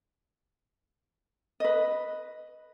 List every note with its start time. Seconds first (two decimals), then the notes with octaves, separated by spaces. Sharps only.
1.60 B4 D#5